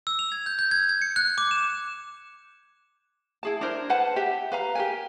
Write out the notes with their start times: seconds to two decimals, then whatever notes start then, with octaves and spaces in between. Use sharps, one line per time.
0.07 E6
0.19 F7
0.32 G#6
0.46 G6
0.59 G6
0.71 G#6
0.89 G#6
1.02 C#7
1.16 F#6
1.38 D6
1.51 E7
3.43 E4 G#4 A5
3.61 D4 E4 A#4 C5
3.89 B4 C5 F#5 A5
4.16 G4 E5
4.52 B4 F5 A#5
4.75 G4 A#4 G#5